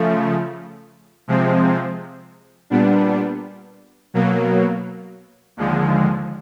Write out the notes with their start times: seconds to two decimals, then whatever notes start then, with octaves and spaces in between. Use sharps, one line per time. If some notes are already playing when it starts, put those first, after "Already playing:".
Already playing: C#3 F3 A3
1.28 C3 F3 G#3 C4
2.70 A#2 G3 B3 D4
4.14 B2 F#3 A#3
5.57 D#2 D3 F3 G#3